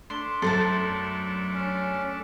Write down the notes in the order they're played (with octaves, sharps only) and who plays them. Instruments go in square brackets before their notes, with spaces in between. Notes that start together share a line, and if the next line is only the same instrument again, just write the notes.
[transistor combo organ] A3 D4 [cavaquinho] C6
[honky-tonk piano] F#2 [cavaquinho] A4 C5 A5
[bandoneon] C#4